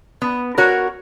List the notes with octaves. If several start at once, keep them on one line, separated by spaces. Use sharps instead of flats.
B3
F#4 A#4 C#5